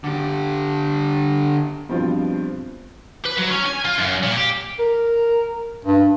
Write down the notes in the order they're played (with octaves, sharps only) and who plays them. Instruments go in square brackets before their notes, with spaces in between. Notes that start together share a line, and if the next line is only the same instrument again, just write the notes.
[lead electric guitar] D3 G4
[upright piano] G2 B2 F3 C4 F4 F#4
[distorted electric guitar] B4
F#3
C#4
G#5
F4
F#2
A#2
G4
[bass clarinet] A#4
G2